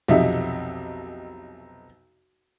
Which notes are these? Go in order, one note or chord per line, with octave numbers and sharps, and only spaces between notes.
B1 F2 C3 D#4 E5